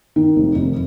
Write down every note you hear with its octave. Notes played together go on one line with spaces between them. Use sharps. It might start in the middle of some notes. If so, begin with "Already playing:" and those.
D#3
F1
F1